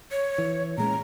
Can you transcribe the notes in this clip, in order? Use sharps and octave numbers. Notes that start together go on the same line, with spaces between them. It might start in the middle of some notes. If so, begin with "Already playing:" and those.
C#5
E3
A#2 G#3 C#4 A#5